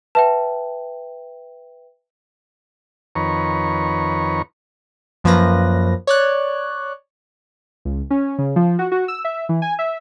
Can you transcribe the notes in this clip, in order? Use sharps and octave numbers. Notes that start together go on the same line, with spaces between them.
B4 E5 G5 A5
F2 D#3 B4 C#5 A#5 C#6
F#2 F3 A#3 B4 A#6
C#5 D5 F#6
C#2
C#4
C#3
F3
F#4
F#4
E6
E5
E3
G#5
E5